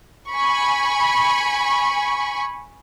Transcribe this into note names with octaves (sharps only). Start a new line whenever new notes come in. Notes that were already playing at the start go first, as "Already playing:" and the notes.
G#5 B5 C#6